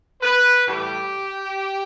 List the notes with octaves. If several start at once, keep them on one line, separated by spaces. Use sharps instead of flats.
B4
A2 E3 G3 G4